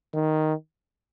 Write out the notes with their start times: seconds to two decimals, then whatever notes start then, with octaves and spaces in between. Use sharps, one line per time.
0.14 D#3